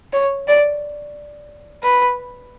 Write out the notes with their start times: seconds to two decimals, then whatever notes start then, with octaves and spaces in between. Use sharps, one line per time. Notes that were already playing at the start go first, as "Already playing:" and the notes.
0.13 C#5
0.48 D5
1.83 B4